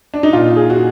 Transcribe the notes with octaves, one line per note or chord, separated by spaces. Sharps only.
D4
D#4
A#2 F4
G#4
F#4